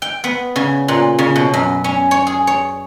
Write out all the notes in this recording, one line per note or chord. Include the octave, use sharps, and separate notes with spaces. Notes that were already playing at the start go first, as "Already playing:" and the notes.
G5
B3
C#3
A#2
C#3
B2
F#2
C#4
C#5
G#4
C#5